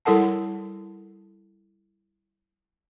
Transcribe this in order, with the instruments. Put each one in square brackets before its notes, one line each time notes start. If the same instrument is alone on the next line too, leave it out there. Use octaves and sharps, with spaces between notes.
[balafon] G3 E4 A4 A#4 F#5 A5